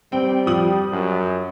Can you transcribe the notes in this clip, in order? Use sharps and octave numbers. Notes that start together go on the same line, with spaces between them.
G3 C4 G5
F3 D#6 F#7
F#2